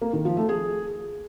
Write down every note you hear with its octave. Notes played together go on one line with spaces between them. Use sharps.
A#3
D#3
F3
A3
G#4